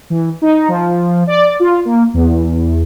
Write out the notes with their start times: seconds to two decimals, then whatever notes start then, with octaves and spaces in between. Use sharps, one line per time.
0.10 E3
0.42 D#4
0.68 F3
1.27 D5
1.60 F4
1.85 A#3
2.14 E2